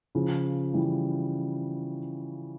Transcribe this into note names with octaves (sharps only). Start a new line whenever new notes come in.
C#3 F3
E3 G3